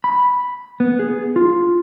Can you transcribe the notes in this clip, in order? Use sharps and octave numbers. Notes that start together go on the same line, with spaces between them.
B5
B3
G#4
F4